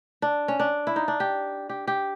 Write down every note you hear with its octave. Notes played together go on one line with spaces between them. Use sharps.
D4
C#4
D4
E4
D#4
D4
G4
G4
G4